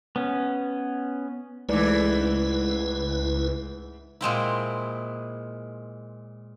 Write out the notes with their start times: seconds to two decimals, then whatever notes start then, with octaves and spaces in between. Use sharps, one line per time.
0.16 B3 C#4
1.69 C#2 G#2 E3 G#3 A3 E4 B4 D5
4.21 A#2 G#3 C4 E4